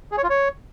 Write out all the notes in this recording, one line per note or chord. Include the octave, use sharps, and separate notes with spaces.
G#4
C#5
F4
C#5